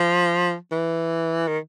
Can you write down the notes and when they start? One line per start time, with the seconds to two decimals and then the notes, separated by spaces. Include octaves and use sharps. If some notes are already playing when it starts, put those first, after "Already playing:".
Already playing: F3
0.72 E3
1.48 D#3